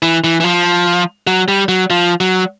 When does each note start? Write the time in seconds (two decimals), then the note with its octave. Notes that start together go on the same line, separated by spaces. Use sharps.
0.02 E3
0.24 E3
0.40 E3
0.44 F3
1.27 F#3
1.48 G3
1.69 F#3
1.90 F3
2.20 F#3